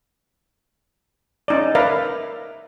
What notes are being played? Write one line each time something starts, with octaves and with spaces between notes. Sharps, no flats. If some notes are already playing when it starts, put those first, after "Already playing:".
C#4 D#4 D5
A#4 B4 D5 E5 F5 A#5